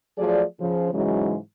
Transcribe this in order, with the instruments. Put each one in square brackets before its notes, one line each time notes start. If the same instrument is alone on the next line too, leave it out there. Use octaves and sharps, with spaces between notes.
[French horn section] F3 F#3 A3 G#4 D5
C#3 F3
G#2 C#3 E3 F#3 G#3